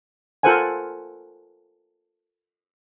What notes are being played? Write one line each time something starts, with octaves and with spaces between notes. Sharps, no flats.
F4 A4 A#4 C5 F#5 G#5